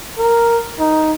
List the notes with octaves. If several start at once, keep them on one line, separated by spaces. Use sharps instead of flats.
A#4
D#4